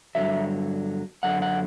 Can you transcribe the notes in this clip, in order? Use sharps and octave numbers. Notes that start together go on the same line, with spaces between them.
G2 D3 F#3 E5
F#2 D3 F#3 F#5
F#5